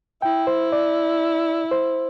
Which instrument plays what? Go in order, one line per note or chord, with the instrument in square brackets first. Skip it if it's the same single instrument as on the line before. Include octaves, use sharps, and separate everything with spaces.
[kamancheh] E4 [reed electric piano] G5
[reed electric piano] C5
D5
C5